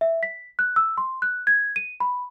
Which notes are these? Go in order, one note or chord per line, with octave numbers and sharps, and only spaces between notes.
E5
B6
F#6
E6
C6
F#6
G#6
D#7
B5